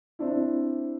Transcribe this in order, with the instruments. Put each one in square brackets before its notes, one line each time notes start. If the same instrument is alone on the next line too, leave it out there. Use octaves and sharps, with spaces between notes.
[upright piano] C4 D4 E4